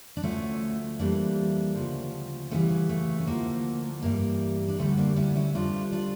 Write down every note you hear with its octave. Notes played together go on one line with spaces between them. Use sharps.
D4
D2 D3 F3 A3 C#4
F2 E3 G3 A#3 D4
D2 C#3 F3
D2 C#3 E3 G3 A3 C#4
A3
C#4
D2 D3 F3 A#3
G2 E3 G3 A#3
D4
D2 D3 G3 A3 C#4
A#3 D4
C#4 E4
C#4 E4
F2 C#3 G3 D4 F4
D4 F4